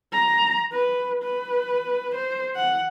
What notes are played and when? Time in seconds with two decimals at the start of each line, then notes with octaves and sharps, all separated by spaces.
0.13 A#5
0.72 B4
1.23 B4
2.15 C5
2.56 F#5